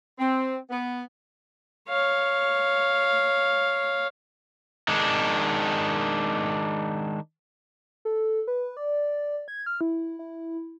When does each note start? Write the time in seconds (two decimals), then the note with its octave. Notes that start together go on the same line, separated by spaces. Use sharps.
0.19 C4
0.70 B3
1.89 C#5 F5
4.88 D#3 G#3 D4
8.05 A4
8.47 B4
8.77 D5
9.48 G#6
9.66 F6
9.81 E4
10.19 E4